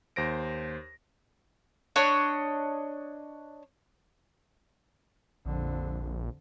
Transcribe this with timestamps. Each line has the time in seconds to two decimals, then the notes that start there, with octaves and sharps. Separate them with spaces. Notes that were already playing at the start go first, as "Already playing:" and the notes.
0.16 D#2 C5 A#6 D7
1.96 D4 C#5 D#5
5.45 A#1 F2 D3